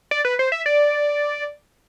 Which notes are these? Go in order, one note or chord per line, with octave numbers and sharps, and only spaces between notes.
D5
B4
C5
E5
D5